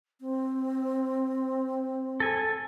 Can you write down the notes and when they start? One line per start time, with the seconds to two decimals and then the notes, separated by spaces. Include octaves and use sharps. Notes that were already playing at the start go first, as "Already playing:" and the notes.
0.21 C4
2.20 A4 G#5